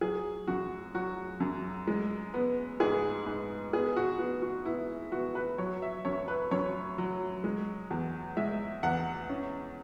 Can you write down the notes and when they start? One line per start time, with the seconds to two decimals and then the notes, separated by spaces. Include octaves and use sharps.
0.01 F#3 G#4
0.47 F#2 F#4
0.94 F#3 F#4
1.40 F#2
1.87 G#3
2.34 B3
2.80 G#2 G#4
3.26 G#2
3.73 B3 G#4
3.96 F#4
4.19 B3 F#4
4.42 F#4
4.65 B3 E4
5.12 B3 F#4
5.35 B4
5.58 F#3 C#5
5.82 E5
6.05 F#2 C#5
6.28 B4
6.51 F#2 C#5
6.98 F#3
7.44 G#3
7.90 E2
8.37 G#3 E5
8.83 E2 F#5
9.29 C#4